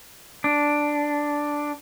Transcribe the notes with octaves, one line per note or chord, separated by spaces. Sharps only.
D4